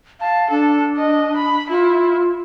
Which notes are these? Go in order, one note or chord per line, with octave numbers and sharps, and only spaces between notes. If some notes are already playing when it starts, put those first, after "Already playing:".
F5 A5
D4 A4
D#5
B5
E4 F4